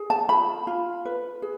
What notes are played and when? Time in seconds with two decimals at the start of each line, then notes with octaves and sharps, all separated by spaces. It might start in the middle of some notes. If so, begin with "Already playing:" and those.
Already playing: G#4
0.10 A5
0.29 F4 B5
0.67 F4
1.05 B4
1.42 G#4